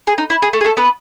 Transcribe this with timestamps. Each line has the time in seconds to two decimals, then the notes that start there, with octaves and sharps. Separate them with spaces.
0.07 G#4
0.18 D#4
0.30 E4
0.42 G#4
0.53 A3 A4
0.61 G#4
0.64 A3 A4
0.77 B3 B4